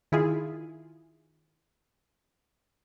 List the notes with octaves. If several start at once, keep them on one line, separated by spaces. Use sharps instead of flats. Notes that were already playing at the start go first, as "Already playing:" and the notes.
D#3 E4 F4 G#4